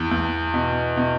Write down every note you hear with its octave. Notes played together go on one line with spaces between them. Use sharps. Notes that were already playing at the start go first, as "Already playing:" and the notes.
Already playing: E2
E2
B2
B2